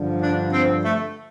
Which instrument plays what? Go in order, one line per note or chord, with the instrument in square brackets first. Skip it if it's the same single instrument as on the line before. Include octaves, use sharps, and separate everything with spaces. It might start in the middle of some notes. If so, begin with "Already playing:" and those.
Already playing: [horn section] G2 D3 F3
D4
C4
A3